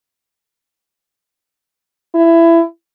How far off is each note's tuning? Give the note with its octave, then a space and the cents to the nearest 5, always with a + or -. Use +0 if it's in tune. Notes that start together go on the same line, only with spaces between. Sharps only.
E4 +20